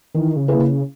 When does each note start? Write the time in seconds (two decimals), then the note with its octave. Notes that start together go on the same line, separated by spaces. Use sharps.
0.14 D#3 E3
0.36 C#3
0.48 A#3 E4 G#4 B4
0.59 C#3